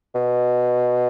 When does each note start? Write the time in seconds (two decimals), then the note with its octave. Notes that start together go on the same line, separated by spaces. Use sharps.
0.15 B2